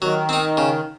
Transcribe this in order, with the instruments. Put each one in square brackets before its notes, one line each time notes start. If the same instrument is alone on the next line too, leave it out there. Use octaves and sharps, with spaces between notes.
[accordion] D#3 [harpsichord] F#3
[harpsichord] C4 D#4
C#3